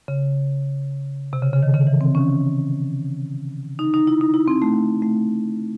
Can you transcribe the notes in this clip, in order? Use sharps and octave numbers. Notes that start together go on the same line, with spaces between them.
C#3
C3
C#3
C#3
D#3
C#3
E3
C4
C#4
D#4
D#4
E4
D#4
E4
C4
A3
A3